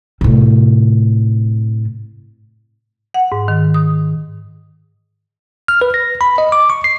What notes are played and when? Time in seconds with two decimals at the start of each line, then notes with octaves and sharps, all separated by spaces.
0.21 A2 C3
3.14 F#5
3.32 G#2
3.48 D#3
3.74 D#6
5.68 F6
5.81 B4
5.94 A#6
6.21 B5
6.38 D#5
6.52 D6
6.70 C#6
6.84 C7